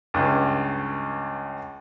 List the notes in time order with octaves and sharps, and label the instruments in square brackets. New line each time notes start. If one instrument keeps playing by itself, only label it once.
[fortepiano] C#2 G2